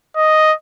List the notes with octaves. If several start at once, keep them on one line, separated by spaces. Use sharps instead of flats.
D#5